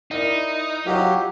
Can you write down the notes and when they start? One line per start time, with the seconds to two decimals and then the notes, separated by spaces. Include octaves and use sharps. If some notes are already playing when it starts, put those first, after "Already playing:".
0.11 D#4 E4 A#4 D5
0.86 F#3 F4 G4 D#5 F5